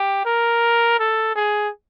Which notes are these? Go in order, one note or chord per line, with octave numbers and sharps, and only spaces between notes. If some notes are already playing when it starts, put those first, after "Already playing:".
Already playing: G4
A#4
A4
G#4